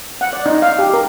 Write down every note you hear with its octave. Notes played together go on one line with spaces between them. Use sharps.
F#5
D5
D#4
F5
G4
A#4